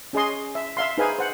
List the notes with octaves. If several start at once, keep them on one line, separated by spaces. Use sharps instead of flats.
C#4 G#4 D#5 C6
E5
E5 F5 C6
D#4 G#4 B4 C5 F5 G#5
C5 F#5